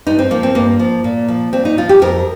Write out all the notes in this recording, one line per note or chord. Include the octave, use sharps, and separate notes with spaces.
G2 D#4
C4
F3 A#3
C4
G2 A#3
F3
A#2
F3
A#2 C4
D#4
F3 F4
G4
F2 A#4